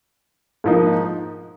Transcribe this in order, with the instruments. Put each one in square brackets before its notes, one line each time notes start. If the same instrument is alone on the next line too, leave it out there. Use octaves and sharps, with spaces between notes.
[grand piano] G#2 F3 A#3 D#4